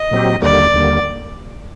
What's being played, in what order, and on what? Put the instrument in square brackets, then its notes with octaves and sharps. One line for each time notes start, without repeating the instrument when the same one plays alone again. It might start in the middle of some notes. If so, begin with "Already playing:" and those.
Already playing: [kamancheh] D#5
[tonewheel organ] A#2 F#3 C4 G4
[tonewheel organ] D#2 D3 G3 A#3 [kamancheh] D5
[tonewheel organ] D#2 D3 G3 A#3